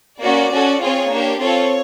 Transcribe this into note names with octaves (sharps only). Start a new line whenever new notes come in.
A#3 C#4 F#4 D5
C#4 F#4 A4
C4 F4 G#4 C#5
A#3 D4 G4
C4 F4 A4 C#5